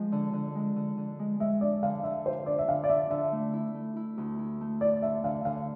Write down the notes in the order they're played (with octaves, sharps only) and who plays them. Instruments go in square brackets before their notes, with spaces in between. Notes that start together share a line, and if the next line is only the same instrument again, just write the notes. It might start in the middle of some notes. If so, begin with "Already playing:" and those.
Already playing: [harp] F3 G#3
D3
D3
G#3
D3
D3
G#3
[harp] G#3 [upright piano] E5
[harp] D4 [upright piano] D5
[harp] D3 [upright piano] F5
[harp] D3 [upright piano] E5
[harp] F4 [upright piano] C5
[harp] D4 [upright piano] D5
[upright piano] E5
[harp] D3 [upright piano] F5
[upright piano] D5
[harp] D4 [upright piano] E5
[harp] D3 [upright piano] E5
[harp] A3
E4
A3
E4
D2
E4
A3
[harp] E4 [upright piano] D5
[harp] D3 [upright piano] E5
[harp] D3 [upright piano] F5
[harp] D3 [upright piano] F5